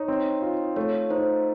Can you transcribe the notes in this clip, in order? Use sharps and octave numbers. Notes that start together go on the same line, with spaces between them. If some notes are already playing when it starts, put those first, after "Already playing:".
Already playing: D#4 C#5
C4
F4
A3 C#5
D#4 C5